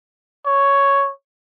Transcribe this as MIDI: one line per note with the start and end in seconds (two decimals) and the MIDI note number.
0.46 1.10 73